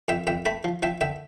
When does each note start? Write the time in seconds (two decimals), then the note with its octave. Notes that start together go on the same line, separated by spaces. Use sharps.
0.08 F2 E5 G5
0.27 F2 E5 G5
0.45 A3 G5 B5
0.64 F3
0.83 F3 E5 G5
1.01 D3 E5 G5